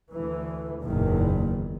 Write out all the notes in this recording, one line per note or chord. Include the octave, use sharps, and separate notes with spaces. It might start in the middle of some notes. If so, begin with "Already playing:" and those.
D2 E3
F#1 E2 A#2 D#3